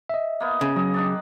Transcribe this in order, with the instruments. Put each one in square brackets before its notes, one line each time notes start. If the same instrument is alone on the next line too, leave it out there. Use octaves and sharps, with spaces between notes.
[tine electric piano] D#5 E5
[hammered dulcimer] A#3 B3
[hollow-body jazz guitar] C#3
[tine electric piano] F#3 [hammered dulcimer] D#5
[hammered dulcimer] D#3 D4 D5